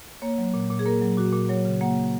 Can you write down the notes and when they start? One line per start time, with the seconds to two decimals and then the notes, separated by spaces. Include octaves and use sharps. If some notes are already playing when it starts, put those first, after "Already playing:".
0.22 A#3 C#5
0.38 F#3
0.54 A#2
0.70 A#2
0.79 G#4
0.86 A#3 A#4
1.01 F#3
1.17 A#2 F#4
1.33 A#2
1.49 F#3 C#5
1.65 C#3
1.81 A#3 F#5